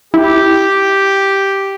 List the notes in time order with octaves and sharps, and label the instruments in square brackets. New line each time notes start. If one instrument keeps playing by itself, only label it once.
[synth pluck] E4 [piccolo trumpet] G4